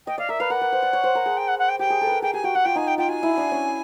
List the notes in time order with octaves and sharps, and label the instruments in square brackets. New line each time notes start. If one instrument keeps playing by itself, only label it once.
[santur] D#5 [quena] G5
[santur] D5 [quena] F5
[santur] A#4 [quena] E5
[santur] B4 [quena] F5
[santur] A#4 [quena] F#5
[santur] B4
C5
D5
C#5
C5
A#4
G#4
[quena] G5
F#5
F#5
G5
[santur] G4 [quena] G5
[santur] G#4
A4
B4
A#4
[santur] G#4 [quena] G5
[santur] G4 [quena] G#5
[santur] F#4 [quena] G5
[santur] F#4 [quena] F#5
[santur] F4 [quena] G5
[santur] D#4 [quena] G#5
[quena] G5
[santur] F4 [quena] G5
[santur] F#4 [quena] G#5
[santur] E4
D4
C#4